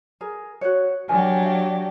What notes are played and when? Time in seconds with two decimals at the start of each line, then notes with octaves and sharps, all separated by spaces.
0.21 G#4 A#4
0.61 F#4 C5 C#5
1.08 F#3 D4 G4 A#4 G#5
1.43 F5 G5